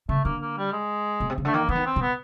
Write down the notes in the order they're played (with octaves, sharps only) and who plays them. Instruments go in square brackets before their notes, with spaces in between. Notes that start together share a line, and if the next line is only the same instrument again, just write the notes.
[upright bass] C#3 [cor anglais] A3
[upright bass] D3 [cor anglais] A#3
[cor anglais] A#3
G3
G#3
[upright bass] B2
C3
C#3
[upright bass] D3 [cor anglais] A3
[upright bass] D#3 [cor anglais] A#3
[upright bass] E3 [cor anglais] B3
[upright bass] D#3
[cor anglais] C4
[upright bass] B2
[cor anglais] B3